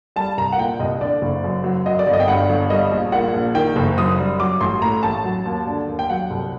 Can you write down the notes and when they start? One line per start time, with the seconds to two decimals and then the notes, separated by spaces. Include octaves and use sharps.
0.16 G3 A5
0.38 C2 A#5
0.52 F#5
0.58 A#2 G5
0.80 C2 D#5
1.01 D3 D5
1.22 F#1
1.44 F#2
1.64 F#3
1.86 F#3 D#5
1.99 D5
2.07 G1
2.13 D#5
2.20 G5
2.28 G2 F#5
2.49 G1
2.70 G3 D#5
2.91 A#1
3.12 A#2 F#5
3.33 A#1
3.55 D#3 G5
3.76 F#1
3.98 F#2 D#6
4.18 G3
4.40 F#3 D6
4.61 A1 C6
4.82 A2 A#5
5.03 A1 A5
5.24 F#3
5.46 D#2
5.67 D3
5.88 D#2
5.99 G5
6.10 F#3 F#5
6.31 C2